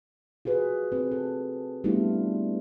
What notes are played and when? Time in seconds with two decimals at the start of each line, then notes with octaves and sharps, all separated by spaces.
0.45 F4 F#4 G#4 B4
0.92 C4 B4
1.11 A4
1.84 G3 A3 B3 D4 E4 F4